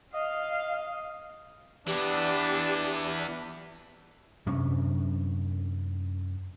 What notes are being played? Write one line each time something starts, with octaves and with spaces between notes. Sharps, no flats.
D#5 F5
E3 B3 D4 G4
F#2 C3 C#4 D4